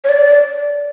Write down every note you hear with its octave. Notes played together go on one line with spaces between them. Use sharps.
C#5
D5